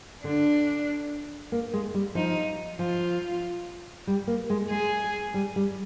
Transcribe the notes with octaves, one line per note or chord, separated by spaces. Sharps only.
D3 D4
A#3
G#3
G3
F3 D#4
F3 F4
G3
A#3
G#3
G#3 G#4
G3
G3